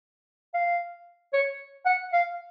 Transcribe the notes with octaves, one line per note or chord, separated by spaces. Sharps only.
F5
C#5
F#5
F5